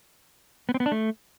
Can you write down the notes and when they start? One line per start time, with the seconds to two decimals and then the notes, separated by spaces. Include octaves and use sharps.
0.69 B3
0.74 C4
0.80 B3
0.86 D4
0.92 A3